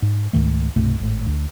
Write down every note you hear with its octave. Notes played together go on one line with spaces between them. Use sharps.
G#2
C#2 G#2 D#3 A3
C2 G2 B2 A3
G#1 A2
D2